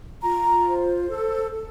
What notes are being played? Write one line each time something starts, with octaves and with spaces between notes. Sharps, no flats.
F4 A#5
C5
A4
A4